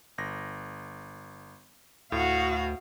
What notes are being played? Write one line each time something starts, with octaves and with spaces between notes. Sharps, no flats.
G1 A#6
D2 A2 F#4 F5